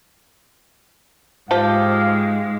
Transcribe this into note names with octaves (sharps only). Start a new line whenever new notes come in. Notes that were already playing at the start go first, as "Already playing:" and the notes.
G#2 F3 G#3 G4 F5